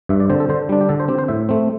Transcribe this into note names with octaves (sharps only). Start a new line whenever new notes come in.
G2 E5
D5
D3 C4 C5
A4
D3 C5
G3 D4
G4
D3 A4
C5
C4 G4
C5
A2 E5
A3 C4